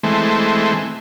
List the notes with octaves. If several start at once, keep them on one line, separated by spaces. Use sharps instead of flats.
E3 G#3 A3 C4